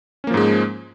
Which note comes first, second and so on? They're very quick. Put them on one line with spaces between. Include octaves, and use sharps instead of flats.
C#4 A#3 F3 G#2 G#3